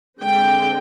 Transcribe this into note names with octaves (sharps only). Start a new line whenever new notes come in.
D3 G#3 C4 G5